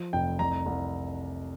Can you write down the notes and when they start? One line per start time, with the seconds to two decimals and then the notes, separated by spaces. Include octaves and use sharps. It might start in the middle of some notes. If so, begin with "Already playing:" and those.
Already playing: F3
0.13 F1 G5
0.39 C2 A#5
0.66 C2